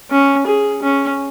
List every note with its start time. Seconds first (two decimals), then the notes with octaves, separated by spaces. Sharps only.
0.11 C#4
0.47 G#4
0.83 C#4